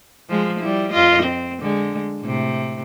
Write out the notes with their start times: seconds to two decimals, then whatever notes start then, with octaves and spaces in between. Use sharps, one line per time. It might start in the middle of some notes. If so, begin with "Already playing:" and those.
0.29 F3 G#3
0.59 G3 E4
0.91 F2 F4 D#5
1.23 C4
1.60 D3 G#3
2.21 A2 C3